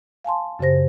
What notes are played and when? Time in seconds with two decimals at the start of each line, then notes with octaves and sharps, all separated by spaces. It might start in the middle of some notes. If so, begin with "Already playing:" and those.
0.25 F5 G#5 A5 C6
0.59 F#2 C#3 G4 C5 A#6